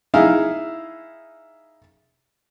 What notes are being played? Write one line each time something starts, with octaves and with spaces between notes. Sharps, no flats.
D#4 E4 G#4 F5